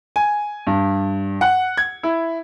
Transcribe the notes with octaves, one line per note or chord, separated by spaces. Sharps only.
G#5
G2
F#5
G#6
E4